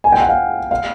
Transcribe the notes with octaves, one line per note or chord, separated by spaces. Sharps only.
G#5
G5
F#5
F5
F5